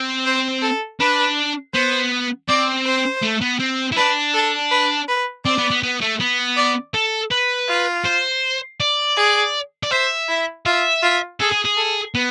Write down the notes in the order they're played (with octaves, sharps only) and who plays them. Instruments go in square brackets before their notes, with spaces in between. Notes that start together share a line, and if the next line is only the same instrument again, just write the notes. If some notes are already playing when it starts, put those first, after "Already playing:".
Already playing: [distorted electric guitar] C4
[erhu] C5
A4
[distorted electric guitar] D4 [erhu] B4
[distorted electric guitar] B3 [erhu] C5
[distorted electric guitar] C4 [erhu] D5
[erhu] C5
[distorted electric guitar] A3
B3
C4
E4
[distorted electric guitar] D4 [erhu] B4
[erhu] A4
B4
B4
[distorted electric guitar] C4 [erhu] D5
[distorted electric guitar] B3
B3
B3
A3
B3
[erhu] D5
[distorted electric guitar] A4
B4
[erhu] F4
[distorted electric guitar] C5
D5
[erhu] G#4
[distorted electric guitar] D5
[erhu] C5 [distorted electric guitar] E5
[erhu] E4
[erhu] F4 [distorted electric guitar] E5
[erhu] F4
[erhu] G#4 [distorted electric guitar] A4
[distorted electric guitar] G#4
G#4
[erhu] A4
[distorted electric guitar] B3